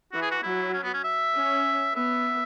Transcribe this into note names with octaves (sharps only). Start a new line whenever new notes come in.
E3 F#4
G#4
F#4
F#3 E4
C#4
B3
C#4
E5
C#4
B3 E5